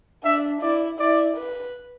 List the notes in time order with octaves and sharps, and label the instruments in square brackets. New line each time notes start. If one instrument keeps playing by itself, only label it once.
[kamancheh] D4 [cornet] E5
[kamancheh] E4 [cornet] D5
[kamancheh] E4 [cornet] D5
[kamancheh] B4